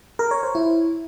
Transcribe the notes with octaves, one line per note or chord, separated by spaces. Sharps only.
A#4
C#5
C5
E4